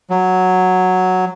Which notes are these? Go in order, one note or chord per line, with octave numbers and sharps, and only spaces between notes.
F#3